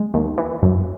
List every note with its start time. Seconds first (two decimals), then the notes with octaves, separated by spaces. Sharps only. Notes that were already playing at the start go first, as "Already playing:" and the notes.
Already playing: G#3
0.14 D#2
0.38 E3
0.63 F#2